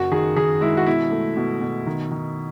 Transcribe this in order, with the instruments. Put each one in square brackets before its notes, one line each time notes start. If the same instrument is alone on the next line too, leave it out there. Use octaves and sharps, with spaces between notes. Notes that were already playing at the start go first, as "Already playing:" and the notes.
Already playing: [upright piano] F#1 F#4
D#3 G#4
D#3 G#4
G#3 E4
F#4
B2 E4
A3
B2
B2
D#3
D#3